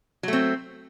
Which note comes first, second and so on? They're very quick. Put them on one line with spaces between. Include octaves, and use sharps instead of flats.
F#3 A3 C4